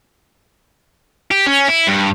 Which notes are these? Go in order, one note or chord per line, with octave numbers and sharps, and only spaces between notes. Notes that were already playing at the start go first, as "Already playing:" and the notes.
G4
C#4
E4
G2